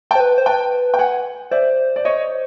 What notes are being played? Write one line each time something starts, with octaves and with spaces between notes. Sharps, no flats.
G5 A5
C5
B4
C5
B4 G5 A5
G5
F#5 G#5
C5 D5 E5
D5
C#5 D#5